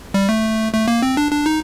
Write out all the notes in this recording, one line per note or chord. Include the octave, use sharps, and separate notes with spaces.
G3
A3
A3
A#3
C4
D4
D4
D#4